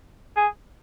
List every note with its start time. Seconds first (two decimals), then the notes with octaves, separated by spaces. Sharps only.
0.37 G#4